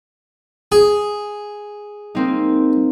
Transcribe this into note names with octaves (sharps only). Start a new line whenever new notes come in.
G#4
A#3 C4 D#4